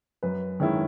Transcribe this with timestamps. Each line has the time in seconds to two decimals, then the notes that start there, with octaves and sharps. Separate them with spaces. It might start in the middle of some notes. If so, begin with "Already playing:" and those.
0.23 F#2 B4
0.60 D#3 G#3 C#4 E4